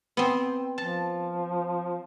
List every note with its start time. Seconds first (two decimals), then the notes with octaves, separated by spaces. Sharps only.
0.17 B3 C4
0.78 F3 A5